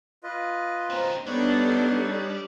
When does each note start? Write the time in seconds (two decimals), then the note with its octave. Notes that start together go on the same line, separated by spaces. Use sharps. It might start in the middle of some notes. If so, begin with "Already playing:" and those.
0.24 F4 B4 D#5
0.90 C4 D#4 C5
1.27 G3 B3 D4 D#4 A4 B4 C#5